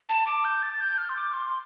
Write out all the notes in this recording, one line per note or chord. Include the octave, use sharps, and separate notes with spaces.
A5
D6
G6
A6
G6
F6
C6
D6
C6